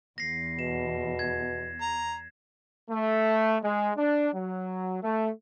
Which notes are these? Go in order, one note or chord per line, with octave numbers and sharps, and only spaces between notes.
E2 A#6 C7
B2 E7
G#6
A#5
A3
G#3
D4
F#3
A3